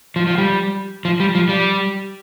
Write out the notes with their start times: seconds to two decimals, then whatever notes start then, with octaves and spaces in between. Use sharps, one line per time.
0.16 F3
0.27 F3
0.38 G3
1.05 F3
1.20 G3
1.35 F3
1.49 G3